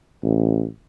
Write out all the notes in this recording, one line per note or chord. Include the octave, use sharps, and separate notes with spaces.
A1